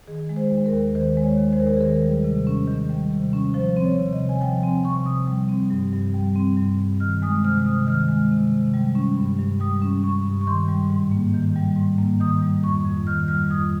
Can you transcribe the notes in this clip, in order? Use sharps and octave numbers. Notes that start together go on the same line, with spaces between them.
D#3 G#4
G#3
C5
D#2
A#4
D#2
D#3 C5
G#3
C#5
D#2
C5
D#2 A#4
C5
G#4
D#3 A#4
G3
C3
C#4
D#3
G3
C3
C#4
F3 C5
C4
C#5
C3
D#5
C3
G#5
F3 G5
C4 G#5
C3 C#6
C3 D#6
G3
C4
G2
G2
G3
C4
G2
G2
D#3 F6
G#3 D#6
C3 F6
C3 D#6
D#3 F6
G#3
C3
C3
G3
C#4
G2
G2
G3 D#6
C#4
G2 C#6
G2
C#6
D#3 C6
G3
G#2
A#3
D#3
G3
G#2
A#3
D#3 D#6
G3
F2 C#6
F2
D#3 F6
G3 F6
F2 D#6